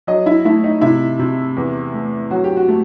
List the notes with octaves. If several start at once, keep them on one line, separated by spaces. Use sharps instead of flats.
F#3 D#5
E4
A3 E4
D#4
C3 E4
C3
E2
A3
F#3 F#4
G4
F#4
A3